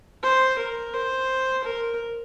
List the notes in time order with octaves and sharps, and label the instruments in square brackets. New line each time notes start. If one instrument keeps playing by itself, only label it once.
[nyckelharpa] C5
A#4
C5
A#4